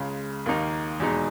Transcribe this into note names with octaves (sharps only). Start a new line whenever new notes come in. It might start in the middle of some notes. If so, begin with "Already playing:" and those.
Already playing: C#2 C#3 G#3
D#2 D#3 A#3 D#4
E2 B2 G#3 D#4